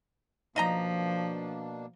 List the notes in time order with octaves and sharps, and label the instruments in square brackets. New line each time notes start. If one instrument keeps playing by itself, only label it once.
[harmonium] B2 A#3 D4 [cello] F3 [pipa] D#4 D#5 A#5